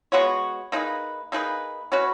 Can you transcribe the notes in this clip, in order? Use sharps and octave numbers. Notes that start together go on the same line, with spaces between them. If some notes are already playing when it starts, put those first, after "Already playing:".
G#3 B3 F#4 C#5
A#3 D#4 G#4 B4
A#3 D#4 G#4 B4
F#3 C#4 F#4 B4